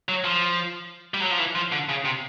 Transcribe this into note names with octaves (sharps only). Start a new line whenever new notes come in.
F#3
F3
G3
F#3
F3
E3
F3
D3
C#3
C3